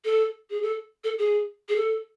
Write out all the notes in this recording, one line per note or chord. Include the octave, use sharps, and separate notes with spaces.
A4
G#4
A4
A4
G#4
G#4
A4